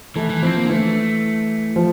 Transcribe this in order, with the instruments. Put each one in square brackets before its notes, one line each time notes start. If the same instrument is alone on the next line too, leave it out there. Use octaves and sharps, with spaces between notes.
[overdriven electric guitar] E3 [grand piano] A3
[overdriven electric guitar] E3
[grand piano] F3 [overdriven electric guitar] C4
[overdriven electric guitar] A#3
[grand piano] D3
[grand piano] E3 [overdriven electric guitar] A3
[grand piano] F3